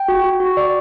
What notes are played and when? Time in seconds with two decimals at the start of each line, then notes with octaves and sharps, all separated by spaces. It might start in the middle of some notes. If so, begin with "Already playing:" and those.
Already playing: G5
0.08 F#4
0.24 F#4
0.40 F#4
0.57 D5